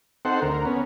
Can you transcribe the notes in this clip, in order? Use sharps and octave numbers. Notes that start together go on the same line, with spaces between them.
C4 D#4 A4 C5 F#5
D2 A#4
B3 C#4